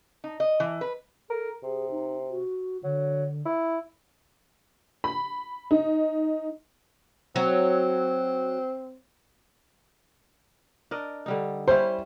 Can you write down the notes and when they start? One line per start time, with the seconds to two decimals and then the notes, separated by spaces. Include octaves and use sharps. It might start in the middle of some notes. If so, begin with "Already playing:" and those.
0.24 D#4
0.40 D#5
0.60 E3
0.81 B4
1.30 A4 A#4
1.63 C3 G#4
1.91 D#4
2.30 F#4
2.84 D3 F#3
3.45 E4
5.04 B5
5.71 D#4
7.36 F#3 C4
10.91 D4 A#4 D#5
11.26 D3 G3 D#4
11.68 G3 C#4 E4 C5